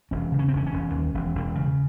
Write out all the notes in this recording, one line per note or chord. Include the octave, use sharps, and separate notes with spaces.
E1 C#4
C#3
C#4
C4
E1 C#4
C#4
E1
D#2
E1
E1
C#3